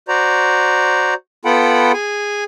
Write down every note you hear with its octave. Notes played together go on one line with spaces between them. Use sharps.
F#4 C5 D5 A#5
B3 F4 A4 F#5 G5 B5
G#4 G#5